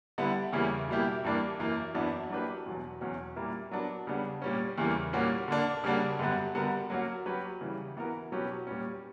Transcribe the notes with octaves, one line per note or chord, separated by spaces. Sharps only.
D3 G3 B3 E4
E2 C#3 G3 A#3 E4
B2 G3 A#3 E4 G4
G2 E3 G3 A#3 D4
F#2 E3 A#3
F#2 E3 B3 D4
F#3 A#3 D4 G4 B4
E2 B2 F#3
E2 B2 F#3 C#4 F#4
A#2 G3 A#3 E4 A#4
F#3 B3 D4 A#4
C#3 G3 B3 D4
A#2 G3 C#4
E2 C#3 E3 G3 A#3
A#2 G3 A#3 C#4 F#4
D3 A#3 D4
C#3 G3 A#3 D4 F#4
F#2 D3 G3 B3 F#4
D3 G3 B3 F#4 A#4
F#3 A#3 C#4 F#4
F#3 C#4 G4 B4
C#3 E3 G3
E3 B3 F#4 A#4
B2 F#3 C#4 G4 B4
A#2 G3 C#4